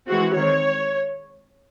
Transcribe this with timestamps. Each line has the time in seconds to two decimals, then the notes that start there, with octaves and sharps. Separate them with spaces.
0.08 E3 G#3 C4 F#4
0.37 D#3 G#3 C4 C#5